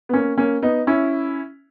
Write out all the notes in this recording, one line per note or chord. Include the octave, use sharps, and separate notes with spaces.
B3
A#3 C#4
A#3 C#4
B3 D#4
C#4 E4